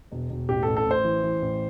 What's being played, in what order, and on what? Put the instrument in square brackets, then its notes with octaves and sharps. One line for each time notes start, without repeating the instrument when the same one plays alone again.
[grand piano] E1
E1
A1 G4
A1 A4
A4
A1 C5
E3
E3
A1